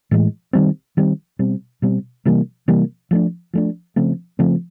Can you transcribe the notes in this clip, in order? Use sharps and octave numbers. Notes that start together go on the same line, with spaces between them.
A2 E3 G#3
D#3 G3 C4
D#3 G3 C4
B2 G3 C4
B2 G3 C4
C3 E3 G3 A#3
C3 E3 G3 A#3
F3 A3 D4
F3 A3 D4
C#3 F3 A3 C4
C#3 F3 A3 C4